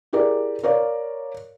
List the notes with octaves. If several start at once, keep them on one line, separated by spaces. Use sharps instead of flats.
E4 G4 G#4 A#4 D5
A#4 C#5 D5 F5